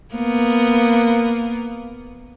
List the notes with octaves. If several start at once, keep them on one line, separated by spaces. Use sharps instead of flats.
A#3 B3